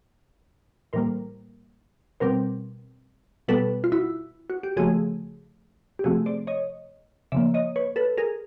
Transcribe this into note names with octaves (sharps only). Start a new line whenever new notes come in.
A2 E3 G3 A#3 A#4 C5
B2 G3 C4 A#4 C5
B2 G3 B3 A4 B4
F4
E4 F#4
F#4
G4
C#3 F3 A3 F#4 G#4
G4
C3 F3 A3 C4 F#4 G#4
C5 D5
C#5 D#5
C#3 F3 A#3 D5 E5
C#5 D#5
B4 C#5
A4 B4
G#4 A#4